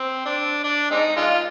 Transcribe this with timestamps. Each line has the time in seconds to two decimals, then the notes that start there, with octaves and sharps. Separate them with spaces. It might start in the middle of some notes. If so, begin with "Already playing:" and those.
Already playing: C4
0.26 D4
0.64 D4
0.91 G#3 C4 D#4
1.17 G#3 D4 F4